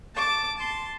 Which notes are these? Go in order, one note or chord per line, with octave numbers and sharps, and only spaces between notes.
A5 D6
A5 C6